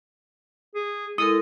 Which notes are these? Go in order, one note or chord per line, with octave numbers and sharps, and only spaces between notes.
G#4
G#3 E4 A4 A#4 D#6